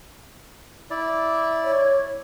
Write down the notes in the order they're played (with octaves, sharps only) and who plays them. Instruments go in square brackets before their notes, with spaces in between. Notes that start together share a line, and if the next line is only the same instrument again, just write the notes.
[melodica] E4 D5
[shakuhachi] C#5